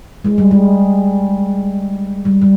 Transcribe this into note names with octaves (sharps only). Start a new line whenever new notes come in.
G#3
G3
G#3
G3
G3